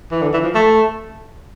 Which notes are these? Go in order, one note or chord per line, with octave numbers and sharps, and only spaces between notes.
E3
D3
E3
F3
A3